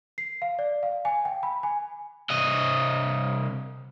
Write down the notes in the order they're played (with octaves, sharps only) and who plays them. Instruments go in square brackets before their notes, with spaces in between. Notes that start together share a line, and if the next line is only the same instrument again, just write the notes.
[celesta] C7
F5
D5
F5
G#5
G5
B5
G#5
[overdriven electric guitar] C2 D#5